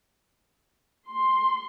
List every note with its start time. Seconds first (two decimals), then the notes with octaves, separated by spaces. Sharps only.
1.08 C6